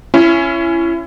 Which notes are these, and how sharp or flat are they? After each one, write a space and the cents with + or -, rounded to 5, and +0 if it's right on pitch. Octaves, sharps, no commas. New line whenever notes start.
C#4 +0 E4 +30